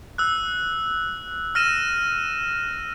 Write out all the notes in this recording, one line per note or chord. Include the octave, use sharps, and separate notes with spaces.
E6 F#6
F6 A#6 D#7 E7